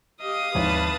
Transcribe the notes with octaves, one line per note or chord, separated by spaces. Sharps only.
G4 D#5 F5 D#6
G#1 D#2 F3 G#3 E4 B4 C#5 A5